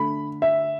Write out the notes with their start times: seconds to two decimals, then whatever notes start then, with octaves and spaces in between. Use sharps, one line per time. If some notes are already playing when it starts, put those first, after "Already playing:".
Already playing: D3 A3 B5
0.42 E5